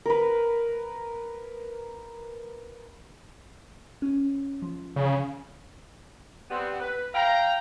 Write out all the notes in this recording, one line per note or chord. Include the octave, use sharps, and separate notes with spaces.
A#4 B4
C#4
F3
C#3
G3 B3 C4
B4
F5 G5 A#5